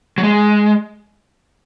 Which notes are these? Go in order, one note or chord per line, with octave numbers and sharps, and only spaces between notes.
F#3
G#3